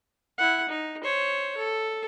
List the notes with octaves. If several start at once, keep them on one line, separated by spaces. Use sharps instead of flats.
E4 F#5
D#4
C5 C#5
A4